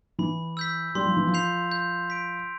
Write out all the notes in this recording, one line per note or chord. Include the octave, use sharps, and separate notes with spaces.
E3 B5
E6 G6 B6
G3 C6
F3
E3
F3
G6 C7 F7
G6
B6 D7